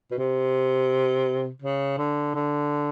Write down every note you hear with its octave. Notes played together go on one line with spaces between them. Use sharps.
B2
C3
C#3
D3
D3